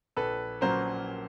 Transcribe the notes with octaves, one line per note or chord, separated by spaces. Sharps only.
A#1 A4 B4
A#2 F#3 A#3 C#4 A#4 C5